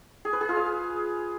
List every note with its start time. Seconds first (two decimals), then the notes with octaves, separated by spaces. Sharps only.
0.25 G#4
0.33 B4
0.41 G#4
0.49 F4
0.57 F5